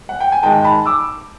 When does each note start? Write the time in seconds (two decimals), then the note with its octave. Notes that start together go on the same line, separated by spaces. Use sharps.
0.09 F#5
0.20 G5
0.32 G#5
0.43 G#2 D#3 G#3 G5 A5
0.64 A5 B5
0.86 D6 E6